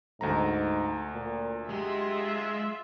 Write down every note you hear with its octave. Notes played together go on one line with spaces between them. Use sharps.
D2 G#2 A3 A#5
A#2
G#3 F4 G4 E5